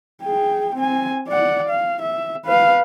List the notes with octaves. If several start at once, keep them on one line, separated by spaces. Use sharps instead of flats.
G#4 G5
C4 G#5
D5 F#5
F5
E5
B4 F5